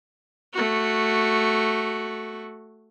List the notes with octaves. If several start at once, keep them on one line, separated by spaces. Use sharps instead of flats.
A3 F#4